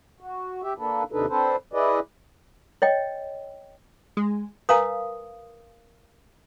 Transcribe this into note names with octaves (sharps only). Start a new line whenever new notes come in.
F#4
G4 E5
A#3 D4 A4 B4
D#2 C3 D4 D#4 A4 B4
C4 D4 A4 B4 C5
E4 G#4 B4 D5 D#5
C#5 D#5 G5
G#3
A#4 B4 F5 G#5 A#5 D#6